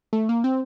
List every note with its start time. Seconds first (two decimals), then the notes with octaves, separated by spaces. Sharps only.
0.13 A3
0.29 A#3
0.44 C4